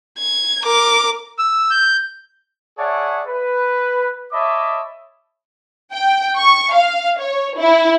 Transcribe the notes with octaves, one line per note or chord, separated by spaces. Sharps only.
G#6
A#4 D6
E6
G6
G#4 C#5 D5 E5 F#5 A5
B4
C#5 D#5 E5 A5 B5 D6
G5
C#6
F5
C#5
E4